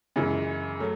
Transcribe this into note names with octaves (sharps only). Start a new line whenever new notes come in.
F#2 C#3 E3 G#3
F#3 A3